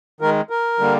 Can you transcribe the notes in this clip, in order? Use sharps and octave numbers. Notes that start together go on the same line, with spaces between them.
D#3 G#3 A#4
A#4
D3 G3 A#3